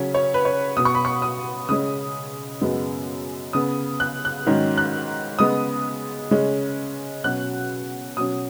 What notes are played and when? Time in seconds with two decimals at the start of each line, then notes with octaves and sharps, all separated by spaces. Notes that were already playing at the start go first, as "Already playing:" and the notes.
Already playing: C#3 F#3 C#4
0.14 C#5
0.34 B4
0.45 C#5
0.77 B2 B3 D#6
0.85 C#6
0.95 B5
1.05 C#6
1.22 D#6
1.69 C#3 G#3 C#4 D#6
2.61 F#2 C#3 G#3 B3
3.53 C#3 B3 D#6
4.00 F#6
4.25 F#6
4.46 G#2 D#3 F#3 C#4
4.77 F#6
5.39 C#3 G#3 B3 D#6
6.31 C#3 G#3 C#4
7.24 B2 F#3 C#4 F#6
8.17 B2 F#3 C#4 D#6